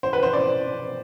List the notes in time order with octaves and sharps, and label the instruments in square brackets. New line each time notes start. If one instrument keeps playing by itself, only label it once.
[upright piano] C5
B4
C5
D5